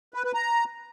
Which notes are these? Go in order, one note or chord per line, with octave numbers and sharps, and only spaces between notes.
B4
B4
A#5